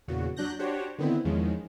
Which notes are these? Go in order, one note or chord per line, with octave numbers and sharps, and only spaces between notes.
E2 A#2 C#3 F#4
F#3 D4 F#6 G6 A#6
D4 F#4 G4 C5 C#5
D3 D#3 B3 C4 E4
E2 D#3 F3 G#3 C#4